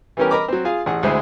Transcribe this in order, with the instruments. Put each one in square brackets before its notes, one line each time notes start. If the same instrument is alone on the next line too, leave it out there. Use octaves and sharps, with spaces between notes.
[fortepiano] E3 G3 B3 C#4 G4 A#4
A#4 D#5 A#5 B5 D6
F#3 C4
F4 G#4 F5
A1 G#4 F#5
D2 G#3 E4 C5 D#6